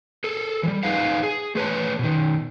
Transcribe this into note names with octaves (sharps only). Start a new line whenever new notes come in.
G#4 A4
E3 G3
D#4 G#4 B4 F5 F#5
G#4
A3 G#4 B4 C#5 A5
B2 D#3